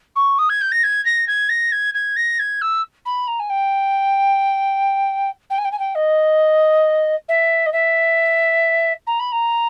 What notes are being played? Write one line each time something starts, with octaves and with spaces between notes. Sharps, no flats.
C#6
D#6
G#6
G6
A#6
G#6
A#6
G#6
A#6
G#6
G#6
A#6
G#6
E6
B5
A#5
G#5
G5
G5
G#5
G5
G#5
G5
D#5
E5
D#5
E5
A#5
B5
A#5